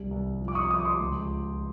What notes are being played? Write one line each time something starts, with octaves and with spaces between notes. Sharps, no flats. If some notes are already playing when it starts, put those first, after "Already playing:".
Already playing: C2
C2
F3
D6
C#6 D#6
D6
F3 C#6 D#6
C6 D6
C#2